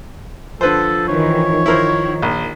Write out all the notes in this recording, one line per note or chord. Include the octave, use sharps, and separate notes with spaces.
D3 F3 A4 B4 C5
D#3 E3 C#5
D#3 E4 A#4 C5
A#1